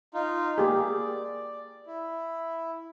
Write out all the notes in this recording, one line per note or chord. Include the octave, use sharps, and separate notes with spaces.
D#4 F4
A#3 G4 G#4 D5
E4